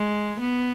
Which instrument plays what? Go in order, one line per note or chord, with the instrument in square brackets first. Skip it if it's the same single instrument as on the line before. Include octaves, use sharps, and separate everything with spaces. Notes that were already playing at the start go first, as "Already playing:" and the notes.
Already playing: [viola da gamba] G#3
B3